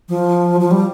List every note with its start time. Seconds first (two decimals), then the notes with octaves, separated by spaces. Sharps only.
0.09 F3
0.61 F3
0.71 G3